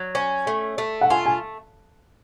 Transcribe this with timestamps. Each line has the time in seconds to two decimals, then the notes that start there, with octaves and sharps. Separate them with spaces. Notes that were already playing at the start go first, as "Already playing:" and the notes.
Already playing: F#3
0.15 C#4
0.47 A3
0.78 A3
1.01 F#5
1.10 F4 G#5
1.26 G#5